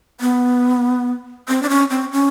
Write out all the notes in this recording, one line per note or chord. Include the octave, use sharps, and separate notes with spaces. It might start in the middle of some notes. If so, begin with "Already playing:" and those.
B3
C4
D4
C#4
C4
C#4